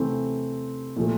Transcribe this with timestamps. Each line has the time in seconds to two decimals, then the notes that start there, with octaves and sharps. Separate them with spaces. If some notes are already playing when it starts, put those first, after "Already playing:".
Already playing: C3 E3 A3 C4
0.96 A#2 F3 A3